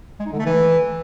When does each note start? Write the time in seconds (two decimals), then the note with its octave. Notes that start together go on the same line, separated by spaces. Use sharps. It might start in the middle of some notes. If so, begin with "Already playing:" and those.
0.19 G#3
0.26 D#4
0.33 D3
0.39 A3
0.46 E3